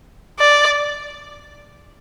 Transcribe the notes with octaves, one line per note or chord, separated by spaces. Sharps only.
D5